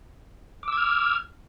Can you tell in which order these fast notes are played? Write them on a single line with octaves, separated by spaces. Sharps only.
D6 E6 G#6 F6